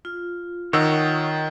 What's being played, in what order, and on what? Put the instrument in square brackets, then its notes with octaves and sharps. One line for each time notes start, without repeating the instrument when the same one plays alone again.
[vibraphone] F4
[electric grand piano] D#3 E6 [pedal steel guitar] C#5 D#5 F#5